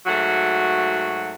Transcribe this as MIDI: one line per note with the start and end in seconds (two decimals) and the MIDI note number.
0.06 1.35 44
0.06 1.35 54
0.06 1.35 57
0.06 1.35 66